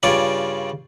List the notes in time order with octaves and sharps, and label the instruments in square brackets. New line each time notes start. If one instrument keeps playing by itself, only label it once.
[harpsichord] G2 C#3 F4 C#5 D5 G#5